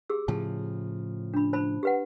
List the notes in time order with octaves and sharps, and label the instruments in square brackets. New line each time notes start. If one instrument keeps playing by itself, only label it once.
[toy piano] G4 G#4 E6
[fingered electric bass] A2 C#3 F3 [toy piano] A5
[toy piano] D4 B5
C5 A5 B5
G4 B4 F#5